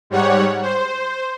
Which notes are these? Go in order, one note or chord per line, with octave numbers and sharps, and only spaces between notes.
G#2 G3 C#5 F#5
C5